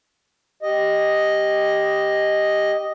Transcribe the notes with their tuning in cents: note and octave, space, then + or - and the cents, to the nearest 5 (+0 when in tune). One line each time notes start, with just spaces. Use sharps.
G4 +0 D#5 +0